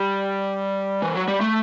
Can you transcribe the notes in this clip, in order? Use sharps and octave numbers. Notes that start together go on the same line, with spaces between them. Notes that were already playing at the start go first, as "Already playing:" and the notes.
Already playing: G3
E3
F#3
G3
A3